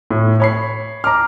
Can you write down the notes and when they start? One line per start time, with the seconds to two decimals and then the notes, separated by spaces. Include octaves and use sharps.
0.11 A2
0.40 C#5 B5 C7
1.04 A#5 D6 F6